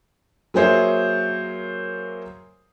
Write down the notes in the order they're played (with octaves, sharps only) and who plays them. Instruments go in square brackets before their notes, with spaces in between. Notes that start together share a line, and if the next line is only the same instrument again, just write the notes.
[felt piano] F#3 A#3 G#4 C5 C#5 E5